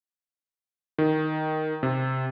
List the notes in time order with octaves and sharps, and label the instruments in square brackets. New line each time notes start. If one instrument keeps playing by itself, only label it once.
[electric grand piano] D#3
C3